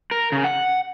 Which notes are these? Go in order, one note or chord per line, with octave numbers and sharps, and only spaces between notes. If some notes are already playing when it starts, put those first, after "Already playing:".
A#4
C#3
F#5